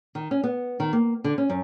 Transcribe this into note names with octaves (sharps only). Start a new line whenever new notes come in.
D#3
C#4
B3
D#3
A#3
D3
C#4
F#2